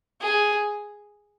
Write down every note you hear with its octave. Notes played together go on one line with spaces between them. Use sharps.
G#4